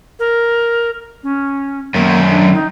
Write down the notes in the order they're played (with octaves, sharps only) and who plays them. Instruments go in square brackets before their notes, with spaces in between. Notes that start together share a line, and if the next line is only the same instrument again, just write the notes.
[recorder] A#4
C#4
[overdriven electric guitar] F#2 D#3 [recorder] A#3
[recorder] D4
D#4